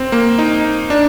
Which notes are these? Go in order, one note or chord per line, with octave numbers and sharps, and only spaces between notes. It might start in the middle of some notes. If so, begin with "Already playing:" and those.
Already playing: C4
A#3
D#4
D4